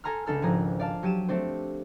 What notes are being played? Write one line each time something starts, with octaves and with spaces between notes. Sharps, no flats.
A4 G#5 A#5 C6 F6
C#2 D4 A4 F6
G#1 F3 F4 G#4 A#5
D5 F5 A5
F#3 G4 D#7 E7
A3 C4 D4 C5